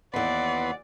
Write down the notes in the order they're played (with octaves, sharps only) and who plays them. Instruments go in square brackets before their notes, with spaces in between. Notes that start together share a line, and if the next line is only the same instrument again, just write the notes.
[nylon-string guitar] D#2 E3 [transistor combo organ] B3 B4 C6 [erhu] D5 [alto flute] F#5